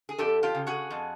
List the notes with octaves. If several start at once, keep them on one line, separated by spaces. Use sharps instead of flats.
G#4
F2 G4 A4
F4 G4
C#3
F#4 G#4
F2